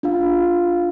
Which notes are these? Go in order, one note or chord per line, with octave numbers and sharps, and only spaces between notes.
D4 F4 F5